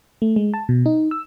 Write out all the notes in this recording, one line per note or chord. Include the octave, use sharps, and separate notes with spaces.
A3
G#3
A5
B2
D#4
E6